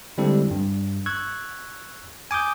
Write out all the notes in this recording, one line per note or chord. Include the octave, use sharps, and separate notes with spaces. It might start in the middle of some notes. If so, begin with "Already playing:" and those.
D3 G3 G#3 C4 E4 A4
G2
C#6 E6 F#6 G#6
G#5 D6 D#6 G6